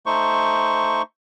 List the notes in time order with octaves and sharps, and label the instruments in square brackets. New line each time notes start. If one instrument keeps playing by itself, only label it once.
[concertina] A3 D#4 C5 C#6